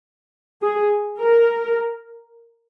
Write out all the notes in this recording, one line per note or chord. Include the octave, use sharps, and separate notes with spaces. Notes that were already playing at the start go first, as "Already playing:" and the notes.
G#4
A#4